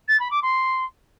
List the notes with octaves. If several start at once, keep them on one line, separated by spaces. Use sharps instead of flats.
A6
B5
D6
C6